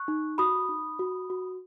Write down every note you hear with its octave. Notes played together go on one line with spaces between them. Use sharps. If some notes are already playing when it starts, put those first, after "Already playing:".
Already playing: C#6 F#6
D#4
F#4 B5 D#6
D#4
F#4
F#4